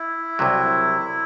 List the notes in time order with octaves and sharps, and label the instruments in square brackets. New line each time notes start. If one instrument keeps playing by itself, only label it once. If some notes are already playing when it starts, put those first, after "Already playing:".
Already playing: [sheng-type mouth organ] E4
[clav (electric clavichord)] C2 C3 F#3